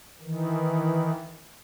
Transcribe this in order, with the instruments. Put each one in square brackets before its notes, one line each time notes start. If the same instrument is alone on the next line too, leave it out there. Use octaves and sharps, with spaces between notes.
[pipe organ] D#3 E3